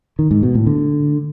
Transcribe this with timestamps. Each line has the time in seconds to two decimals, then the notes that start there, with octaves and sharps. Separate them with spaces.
0.19 D#3
0.31 G#2
0.43 B2
0.55 A2
0.67 D3